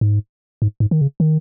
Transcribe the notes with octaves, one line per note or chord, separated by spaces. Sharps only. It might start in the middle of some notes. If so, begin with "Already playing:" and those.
G#2
G#2
G#2
D#3
C#3
D#3